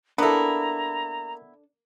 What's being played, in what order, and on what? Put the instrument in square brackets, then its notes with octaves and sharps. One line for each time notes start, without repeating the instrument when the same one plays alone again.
[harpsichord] A#3 [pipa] B3 E4 [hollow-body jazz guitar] D4 A4 [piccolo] A#5